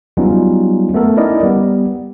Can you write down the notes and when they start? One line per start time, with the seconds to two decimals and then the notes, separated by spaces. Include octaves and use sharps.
0.17 F#3 G3 B3 C#4 D#4 F4
0.94 A3 B3 A4 A#4
1.17 C#4 D#4 E4 A#4 D5 D#5
1.43 G3 B3